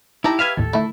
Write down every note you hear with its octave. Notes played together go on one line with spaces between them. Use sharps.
D#4 E4 G4 A5 A#5
B4 E5 F5 F6 G#6
G#1 D#2 A2 A4
D3 D#3 A3 E4